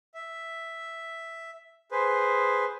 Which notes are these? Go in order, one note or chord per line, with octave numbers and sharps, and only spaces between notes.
E5
G#4 B4 C5